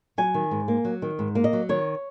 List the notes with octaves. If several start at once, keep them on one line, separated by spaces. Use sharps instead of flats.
F#3 G#5
D#3
G#2
A#3
F#3
D#3
G#2
A#3
D#5
F#3
D#3 C#5